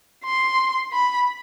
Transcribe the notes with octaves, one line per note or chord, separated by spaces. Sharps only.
C6
B5